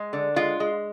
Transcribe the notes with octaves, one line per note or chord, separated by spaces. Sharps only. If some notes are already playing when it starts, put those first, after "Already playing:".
Already playing: G#3
D3
G#3 F4
G#3